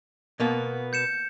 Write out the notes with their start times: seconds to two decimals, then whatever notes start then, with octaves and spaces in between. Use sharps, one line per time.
0.40 B2 A#3 B3
0.93 G6 C#7 E7